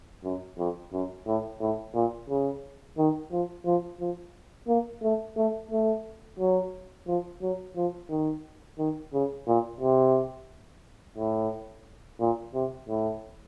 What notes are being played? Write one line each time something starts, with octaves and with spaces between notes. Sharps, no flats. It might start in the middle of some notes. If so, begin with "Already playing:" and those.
F#2
F2
F#2
A2
A2
A#2
C#3
D#3
F3
F3
F3
A#3
A3
A3
A3
F#3
F3
F#3
F3
D#3
D#3
C#3
A#2
C3
A2
A#2
C3
A2